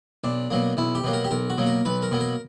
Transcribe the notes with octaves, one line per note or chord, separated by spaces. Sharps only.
B1 D4
B2 F#3 A#3
B1 E4
G4
B2 F#3 A#3
A#4
G4
B1 A#4
F#4
B2 F#3 A#3
A#4
B1 B4
A#4
B2 F#3 A#3
A#4